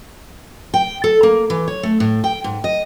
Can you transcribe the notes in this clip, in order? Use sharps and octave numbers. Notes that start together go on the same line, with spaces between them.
G5
A4
A#3
E3
C#5
A3
A2
G5
G#2
D#5